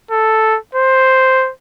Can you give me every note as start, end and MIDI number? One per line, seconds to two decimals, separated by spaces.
0.11 0.58 69
0.75 1.51 72